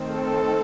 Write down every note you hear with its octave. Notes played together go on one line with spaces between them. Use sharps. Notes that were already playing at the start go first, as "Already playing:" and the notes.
Already playing: D#3 A3 C4
A4